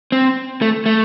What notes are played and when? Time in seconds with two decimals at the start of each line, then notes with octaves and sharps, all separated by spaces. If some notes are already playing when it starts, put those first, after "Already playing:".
0.12 C4
0.62 A3
0.86 A3